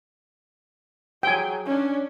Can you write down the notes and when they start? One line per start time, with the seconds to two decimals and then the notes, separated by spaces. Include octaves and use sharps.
1.23 F#3 G#4 G5 G#5
1.66 C#4 D4